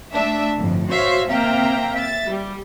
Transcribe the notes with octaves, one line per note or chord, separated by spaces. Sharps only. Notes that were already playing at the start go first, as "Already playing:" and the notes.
A3 D4 E5
G1 F2 A2
F#4 C5 C#5 E5 F5
A#3 C4 E5 F5 G5 A#5
E5 A6
G3